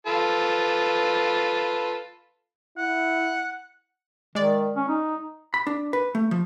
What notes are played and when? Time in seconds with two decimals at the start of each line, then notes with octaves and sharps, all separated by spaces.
0.07 F4 A4 B4
2.77 E4 F#5
4.35 D#3 G#3 D5
4.76 C#4
4.89 D#4
5.54 B5
5.67 D4
5.93 B4
6.15 A3
6.31 F3